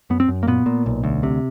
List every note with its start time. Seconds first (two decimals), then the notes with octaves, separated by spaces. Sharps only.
0.10 F#2 B3
0.20 C4
0.28 F#2
0.43 A#3
0.47 A#2 B3
0.66 A#2
0.86 B1
1.04 D2
1.23 C3